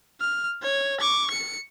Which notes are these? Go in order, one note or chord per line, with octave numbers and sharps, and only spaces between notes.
F6
C#5
C#6 D6
C#7